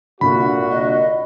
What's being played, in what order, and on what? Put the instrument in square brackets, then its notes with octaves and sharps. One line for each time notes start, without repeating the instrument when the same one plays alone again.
[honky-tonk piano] C2 D3 [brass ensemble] A#2 F#4 [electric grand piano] B5
[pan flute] D#5